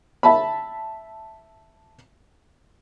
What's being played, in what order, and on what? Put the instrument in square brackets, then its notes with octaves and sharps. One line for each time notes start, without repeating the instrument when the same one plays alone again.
[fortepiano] E5 A5 B5